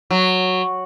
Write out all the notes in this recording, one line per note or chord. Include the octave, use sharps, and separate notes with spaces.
F#3